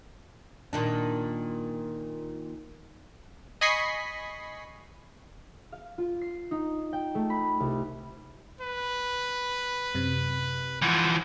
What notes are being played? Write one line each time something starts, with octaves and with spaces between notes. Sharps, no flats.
A#2 D#3 D4
D#5 G#5 B5 C#6 B6 C7
F5
F4
C7
D#4
G5
A3
B5
C2
B4
F#2 C3
E3 F3 F#5